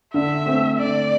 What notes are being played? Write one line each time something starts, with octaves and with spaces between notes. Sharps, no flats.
D3 E5
A3 C4
D3 D5